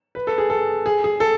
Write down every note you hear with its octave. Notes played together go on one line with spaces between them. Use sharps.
B4
A4
G#4
A4
G#4
G#4
A4